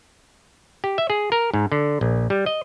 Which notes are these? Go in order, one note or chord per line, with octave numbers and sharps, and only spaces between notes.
G4
E5
G#4
A#4
G#2
D3
A#1
G3
D#5